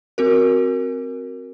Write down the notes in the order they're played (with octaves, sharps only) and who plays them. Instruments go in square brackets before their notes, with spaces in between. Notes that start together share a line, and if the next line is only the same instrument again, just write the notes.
[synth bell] C4 F#4 A#4